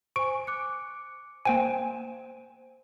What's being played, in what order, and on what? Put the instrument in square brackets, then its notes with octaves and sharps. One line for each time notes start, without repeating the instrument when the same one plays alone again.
[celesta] C5 G#5 [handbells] C#6 D7
[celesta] D6 F#6 C#7
[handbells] A#3 G5 G#5 [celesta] C5 E7